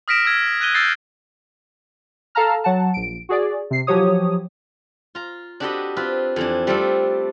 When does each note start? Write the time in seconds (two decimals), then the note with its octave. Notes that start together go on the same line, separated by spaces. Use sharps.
0.08 D#6 F6 A#6 B6 D7 E7
0.25 E6 F6 G#6
0.61 F#6 G#6 D#7 G7
0.75 E6 G6 A6 C7
2.35 A4 F5 A5 A#5 F6
2.64 F#3 F#5 A5
2.94 A#1 D7
3.29 F#4 G#4 D5
3.70 C3 C7
3.87 F3 F#3 G4 C#5 D#6
5.15 F4 A#5
5.60 D4 F#4 G4 A4 B4 D#5
5.97 C4 F4 B4
6.36 F2 E3 D4
6.67 G3 A3 C4 D4 F4 A4